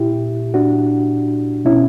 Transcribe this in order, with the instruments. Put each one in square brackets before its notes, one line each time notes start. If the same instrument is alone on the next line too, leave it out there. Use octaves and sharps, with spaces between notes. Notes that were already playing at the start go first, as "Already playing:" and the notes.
Already playing: [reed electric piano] A#2 E4 G4
D4 F#4
B2 C#4 E4